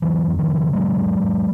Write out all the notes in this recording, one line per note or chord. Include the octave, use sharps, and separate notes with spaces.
F2 E3 F#3
F2
D#3 F3
C#3
G#2 F#3 G#3
G#2
G#2